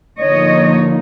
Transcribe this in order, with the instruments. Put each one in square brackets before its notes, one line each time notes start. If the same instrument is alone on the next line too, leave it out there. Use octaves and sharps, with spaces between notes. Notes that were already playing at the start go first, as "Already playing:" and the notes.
[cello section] D3 F3 A#3 D#4 C#5 D#5